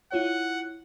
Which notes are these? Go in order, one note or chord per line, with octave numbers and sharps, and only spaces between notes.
E4 F4 C#5 F#5